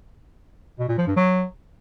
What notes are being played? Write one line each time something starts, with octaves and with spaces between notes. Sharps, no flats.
B2
A#2
F3
G2
F#3